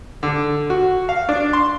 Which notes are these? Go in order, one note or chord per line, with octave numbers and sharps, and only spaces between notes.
D3
F#4
F5
D4
C6